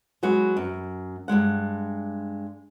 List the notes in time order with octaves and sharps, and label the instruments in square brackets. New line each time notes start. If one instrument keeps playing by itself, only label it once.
[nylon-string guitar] F#3 G#3 B3 F#4
F#2
G2 F#3 G#3 F#5